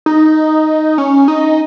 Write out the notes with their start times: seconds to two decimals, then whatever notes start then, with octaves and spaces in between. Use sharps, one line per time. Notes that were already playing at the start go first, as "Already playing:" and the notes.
0.06 D#4
0.98 C#4
1.28 D#4